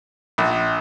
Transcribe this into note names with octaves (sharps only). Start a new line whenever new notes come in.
A#1